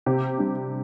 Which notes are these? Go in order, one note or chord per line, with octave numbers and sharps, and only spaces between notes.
C3 G4
G3 D4